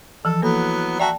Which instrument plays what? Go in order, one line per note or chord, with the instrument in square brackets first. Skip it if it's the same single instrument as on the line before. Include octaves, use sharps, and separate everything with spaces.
[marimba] E3 F3 [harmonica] A4
[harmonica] E3 F#3 B3 [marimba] A#3 A4
[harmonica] F#4 E5 A#5 [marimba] D5 G5 A5